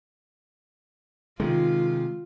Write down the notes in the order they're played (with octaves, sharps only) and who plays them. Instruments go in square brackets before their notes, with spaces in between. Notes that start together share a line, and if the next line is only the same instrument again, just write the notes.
[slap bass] C3 G#3 [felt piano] D#3 [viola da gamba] F4